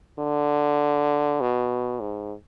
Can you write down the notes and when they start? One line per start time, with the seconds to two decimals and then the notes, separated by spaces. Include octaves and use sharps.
0.19 D3
1.41 B2
2.01 G#2